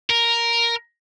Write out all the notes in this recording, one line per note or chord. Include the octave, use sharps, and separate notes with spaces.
A#4